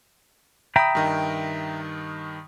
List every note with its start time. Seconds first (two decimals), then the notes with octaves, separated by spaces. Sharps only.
0.76 E5 G5 A#5 B5 D#6
0.95 G2 D#3 D#5